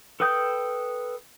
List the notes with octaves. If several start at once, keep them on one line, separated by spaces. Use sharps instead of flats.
A4 B4 G5 D#6 G6